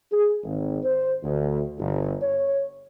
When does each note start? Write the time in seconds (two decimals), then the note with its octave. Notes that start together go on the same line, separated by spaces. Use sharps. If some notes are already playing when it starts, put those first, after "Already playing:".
0.11 G#4
0.44 G#1
0.84 C5
1.23 D2
1.79 G1
2.22 C#5